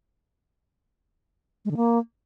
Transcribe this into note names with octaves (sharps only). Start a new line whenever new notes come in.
G#3
D3
A#3